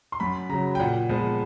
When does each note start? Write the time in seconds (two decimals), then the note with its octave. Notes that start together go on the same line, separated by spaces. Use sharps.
0.12 C6
0.20 F#2 B5
0.49 C#3 F#3 A#5
0.75 G5
0.80 A#2 F#5
1.09 F3 G#3 B3